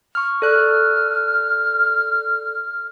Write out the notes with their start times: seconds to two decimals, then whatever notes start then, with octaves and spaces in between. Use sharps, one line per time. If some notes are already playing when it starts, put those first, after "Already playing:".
0.15 C#6 F6
0.42 A4 D5 F6 F#6